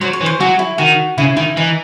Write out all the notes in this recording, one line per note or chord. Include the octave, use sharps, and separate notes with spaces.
F#3 C5
C#5
E3
C5
F#3 F#4
E4
D#3 F#4
C#3 E4
D#3 E4
E3 D#4